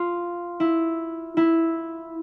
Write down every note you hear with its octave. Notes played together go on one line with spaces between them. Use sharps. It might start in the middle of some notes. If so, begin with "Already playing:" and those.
Already playing: F4
E4
E4